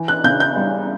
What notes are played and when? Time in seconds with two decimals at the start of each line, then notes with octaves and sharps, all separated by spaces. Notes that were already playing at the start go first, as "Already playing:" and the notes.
Already playing: E3
0.08 F#6
0.24 C#3 G6
0.40 G6
0.57 G3